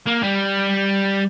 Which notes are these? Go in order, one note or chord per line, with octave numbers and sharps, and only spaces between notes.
A#3
G3